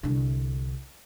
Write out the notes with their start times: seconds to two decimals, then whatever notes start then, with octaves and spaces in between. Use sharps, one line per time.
0.03 C2 D3